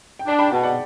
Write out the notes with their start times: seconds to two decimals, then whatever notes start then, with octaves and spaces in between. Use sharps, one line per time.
0.19 G5
0.26 D4 A5
0.39 G5 B5
0.51 B2 F#5 A5
0.64 D5 F#5